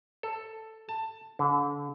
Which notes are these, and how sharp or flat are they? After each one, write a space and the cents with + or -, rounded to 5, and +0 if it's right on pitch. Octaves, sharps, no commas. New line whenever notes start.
A4 +5
A5 +15
D3 -35